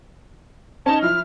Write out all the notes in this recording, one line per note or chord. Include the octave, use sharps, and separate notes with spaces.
C#4 D#4 A5
F3 E4 F6